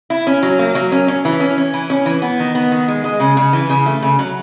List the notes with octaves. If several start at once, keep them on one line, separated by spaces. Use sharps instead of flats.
E4
C#4
F#3
A#3
F#3
C#4
C#4
E3
C#4
C#4
E3
C#4
E3
B3
D#3
B3
D#3
G#3
G#3
C#3
C#3
E3
C#3
A3
C#3
F#3